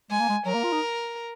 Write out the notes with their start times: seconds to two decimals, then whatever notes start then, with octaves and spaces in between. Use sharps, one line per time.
0.11 G#3 G#5
0.20 A#3
0.29 G#3
0.46 F#3 A#4
0.54 A#3
0.63 F4
0.72 D#4